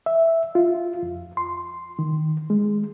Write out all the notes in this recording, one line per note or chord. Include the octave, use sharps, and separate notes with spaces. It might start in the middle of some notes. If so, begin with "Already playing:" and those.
E5
F4
F2
C6
D#3
G#3